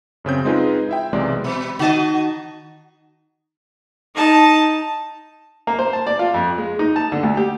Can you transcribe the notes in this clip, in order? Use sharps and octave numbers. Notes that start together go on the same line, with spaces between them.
F#2 C#3 C4 G6
G#3 C4 D#4 F4 G#4 B4
E4 E5 G5
B1 C3 E3 G#3 D5 C6
B2
D#3 F#4 D#5 A5
D#4 A5
A#3
C5
A5
D5
F4
F2
G#3
D#4
A5
D3
D2
G4